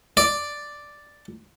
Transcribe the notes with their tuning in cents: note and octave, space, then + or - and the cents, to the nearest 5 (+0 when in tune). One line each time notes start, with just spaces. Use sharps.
D5 +0